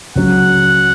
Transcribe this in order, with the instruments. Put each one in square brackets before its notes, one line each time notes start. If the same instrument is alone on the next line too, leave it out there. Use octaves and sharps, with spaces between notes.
[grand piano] C#2 C#3 F#3 C#4 [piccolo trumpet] F#5